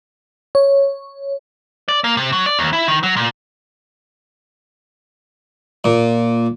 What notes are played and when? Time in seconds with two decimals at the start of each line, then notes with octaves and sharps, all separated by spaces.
0.55 C#5
1.88 D5
2.04 A#3
2.17 C3
2.32 F#3
2.46 D5
2.59 D#2
2.73 E4
2.88 D#3
3.03 F#3
3.17 A#2
5.84 A#2